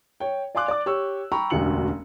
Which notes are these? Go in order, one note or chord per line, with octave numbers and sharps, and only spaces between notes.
C#5 G5
D5 F5 G#5 C6 D6 F#6
D5 D6
G4 C#5 C#6 E6
G5 A#5 B5 C#6
E1 A1 D2 F#4 C#7 F#7